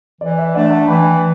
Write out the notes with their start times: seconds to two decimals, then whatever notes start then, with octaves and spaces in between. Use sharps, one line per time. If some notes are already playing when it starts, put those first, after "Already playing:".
0.21 E3 D5
0.38 E5
0.54 A3 D4 D5 F#5
0.71 F#5 A5
0.88 E3 G5 B5